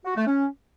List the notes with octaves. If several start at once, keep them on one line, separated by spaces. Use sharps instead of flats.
F#4
A3
C#4